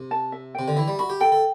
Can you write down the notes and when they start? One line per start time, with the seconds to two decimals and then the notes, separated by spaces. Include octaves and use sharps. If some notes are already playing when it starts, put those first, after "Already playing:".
Already playing: C3
0.11 A5
0.32 E5
0.55 C3 G5
0.68 D3
0.76 E3 E5
0.88 G3
0.99 F#4 B5
1.10 G4
1.21 A4 G5
1.32 A4